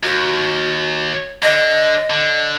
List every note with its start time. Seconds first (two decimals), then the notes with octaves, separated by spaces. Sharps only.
0.03 D#2 F#4
1.43 D3 D#5
2.10 D3